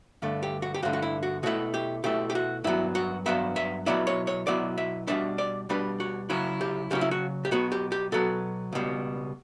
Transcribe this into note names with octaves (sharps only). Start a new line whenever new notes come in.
G2 D3 A3
G4
F#4
G4
G2 D3 A3 F#4
F#4
E4
F#4
B2 A3 E4 F#4
G4
B2 A3 E4 G4
G4
F#4
G2 F#3 B3 E4
F#4
G2 F#3 B3 E5
E5
B2 F#3 B3 E4 D5
C#5
C#5
B2 F#3 B3 E4 D5
E5
B2 G3 D4 E5
D5
B2 G3 D4 B4
F#4
C#3 F#3 C#4 E4 F#4
G4
C#3 F#3 C#4 E4 G4
E4
F#4
G4
B2 F#3 B3 F#4
G4
G4
B2 F#3 B3 A4
C#2 B2 G3